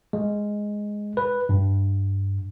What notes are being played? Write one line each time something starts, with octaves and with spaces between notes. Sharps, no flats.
G#3
B4
G2